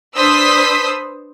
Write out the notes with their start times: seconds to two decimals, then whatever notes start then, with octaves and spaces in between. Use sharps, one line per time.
0.14 D4 B4 C5 D#6 E6 B6